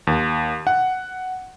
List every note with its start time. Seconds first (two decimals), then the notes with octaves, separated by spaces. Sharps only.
0.07 D#2
0.67 F#5